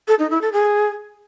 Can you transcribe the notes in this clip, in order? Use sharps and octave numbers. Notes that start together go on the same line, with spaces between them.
A4
D#4
E4
A4
G#4